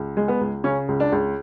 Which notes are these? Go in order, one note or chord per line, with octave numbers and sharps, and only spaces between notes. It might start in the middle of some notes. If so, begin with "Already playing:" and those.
Already playing: C#2
G#3
B3
C#2
C#3 C#4
C#2
D4
C#2